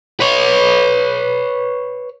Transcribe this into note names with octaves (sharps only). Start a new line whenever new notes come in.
B4 C#5